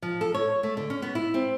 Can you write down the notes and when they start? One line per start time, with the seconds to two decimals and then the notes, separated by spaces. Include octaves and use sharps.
0.02 F3
0.21 A4
0.34 C#5
0.63 A3
0.77 D3
0.90 C#4
1.02 B3
1.15 E4
1.34 C4